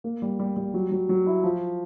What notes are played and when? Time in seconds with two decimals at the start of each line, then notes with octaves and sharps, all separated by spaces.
0.04 A#3
0.22 G3
0.39 G3
0.57 G3
0.74 F#3
0.92 F#3
1.09 F#3
1.26 E4
1.43 F3